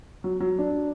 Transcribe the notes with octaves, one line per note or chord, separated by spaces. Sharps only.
F#3
F#3
D4